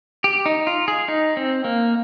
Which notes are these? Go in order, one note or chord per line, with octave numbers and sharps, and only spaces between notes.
G4
D#4
F4
G#4
D#4
C4
A#3